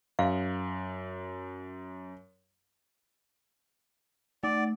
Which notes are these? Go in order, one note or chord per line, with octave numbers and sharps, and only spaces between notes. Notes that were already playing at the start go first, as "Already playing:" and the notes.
F#2 F5
A3 D5